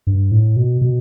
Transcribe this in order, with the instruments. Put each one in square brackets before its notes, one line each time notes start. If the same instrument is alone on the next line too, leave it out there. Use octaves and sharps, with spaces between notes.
[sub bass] G2
A2
B2
B2